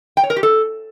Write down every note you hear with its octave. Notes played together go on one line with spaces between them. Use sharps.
G5
C#5
A#4
G4
A4